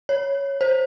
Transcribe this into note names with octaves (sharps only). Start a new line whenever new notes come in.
C#5
C5